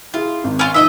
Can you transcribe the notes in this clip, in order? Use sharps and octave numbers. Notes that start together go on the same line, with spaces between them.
E4 F4 G#4
G#1
C#4 F4 F6
F3 D#4 C5 D#5 E5